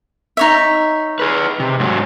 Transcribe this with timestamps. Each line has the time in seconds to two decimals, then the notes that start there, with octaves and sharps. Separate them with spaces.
0.37 D#4 C#5 E5
1.19 G#4 B4
1.60 C3
1.80 G#2 F#3